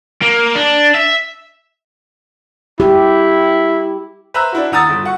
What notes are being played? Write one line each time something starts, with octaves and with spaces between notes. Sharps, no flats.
A#3
D4
E5
E4 G4
B4 C5 E5 A#5 E6 F#6
D4 E4 F#4
D#2 F#5 A#5 D#6 E6 A6
G1
F#4 F#5 C#6